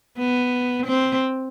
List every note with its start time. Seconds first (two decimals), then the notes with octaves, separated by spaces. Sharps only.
0.18 B3
0.86 C4